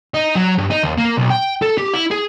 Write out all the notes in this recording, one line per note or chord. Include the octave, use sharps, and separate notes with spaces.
D#4
F#3
G2
D#4
D#2
A#3
B1
G5
A4
G4
E4
G#4